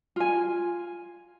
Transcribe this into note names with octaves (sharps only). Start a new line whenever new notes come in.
F4 G#5